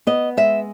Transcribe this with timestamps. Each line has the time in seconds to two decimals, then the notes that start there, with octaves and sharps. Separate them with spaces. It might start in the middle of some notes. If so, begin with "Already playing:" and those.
0.07 B3 D#5
0.37 G#3 E5